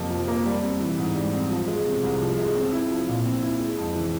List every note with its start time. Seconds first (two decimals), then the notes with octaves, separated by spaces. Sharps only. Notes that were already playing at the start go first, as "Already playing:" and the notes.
Already playing: F2 C3 F3 A#3
0.10 F3
0.28 A#3
0.46 G3
0.63 C4
0.80 E3
0.98 G#2
1.16 G3
1.33 C4
1.50 F3
1.68 G#3
1.85 C3
2.03 C2
2.21 F3
2.38 G#3
2.55 C4
2.72 E4
2.91 F3
3.08 A#2
3.26 C4
3.43 E4
3.60 G#3
3.78 F2
3.95 E3